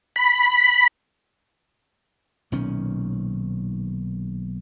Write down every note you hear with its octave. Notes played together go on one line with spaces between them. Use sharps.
B5
B1 A#2 D#3 C#4